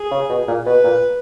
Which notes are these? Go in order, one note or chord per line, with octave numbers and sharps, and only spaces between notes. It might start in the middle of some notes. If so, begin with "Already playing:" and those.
Already playing: G#4
C#3
B2
A#2
B2 B4
A#2